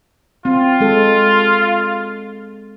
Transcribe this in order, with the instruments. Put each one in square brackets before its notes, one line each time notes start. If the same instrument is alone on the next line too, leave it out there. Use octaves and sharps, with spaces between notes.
[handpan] C4 [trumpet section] F4
[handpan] G#3 A4